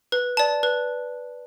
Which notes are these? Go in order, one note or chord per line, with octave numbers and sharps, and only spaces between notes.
B4
D5 A5
B4